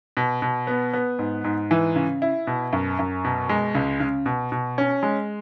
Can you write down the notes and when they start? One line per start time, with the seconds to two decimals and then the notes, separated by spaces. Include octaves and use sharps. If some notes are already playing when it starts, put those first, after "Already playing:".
0.17 B2
0.42 B2
0.67 B3
0.93 B3
1.19 G#2
1.44 G#2
1.71 E3
1.96 C#3
2.22 E4
2.47 B2
2.73 F#2
2.99 F#2
3.24 B2
3.49 G#3
3.75 C#2
4.00 C#3
4.26 B2
4.52 B2
4.78 C#4
5.03 G#3